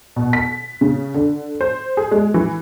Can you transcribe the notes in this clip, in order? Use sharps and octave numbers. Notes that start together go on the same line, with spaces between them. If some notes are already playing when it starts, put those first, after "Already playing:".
B2
B6
C#3
D3
C5
G#4
G#3
E3